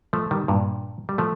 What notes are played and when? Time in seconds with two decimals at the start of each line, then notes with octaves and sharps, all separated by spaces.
0.13 F3 A3
0.31 D#3 G3
0.48 G2 A#2
1.09 G3
1.18 F3 A3